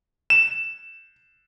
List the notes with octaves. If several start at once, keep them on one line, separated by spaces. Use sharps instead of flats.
E7